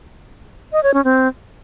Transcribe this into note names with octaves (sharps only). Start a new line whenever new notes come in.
D#5
C#5
C#4
C4